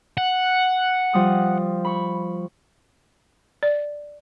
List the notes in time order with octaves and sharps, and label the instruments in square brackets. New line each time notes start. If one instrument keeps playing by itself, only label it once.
[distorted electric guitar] F#5
[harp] F3 G3 D#6
B5 C#6
[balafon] D5